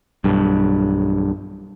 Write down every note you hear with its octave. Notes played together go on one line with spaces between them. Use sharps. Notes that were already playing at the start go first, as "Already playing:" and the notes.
B1 G2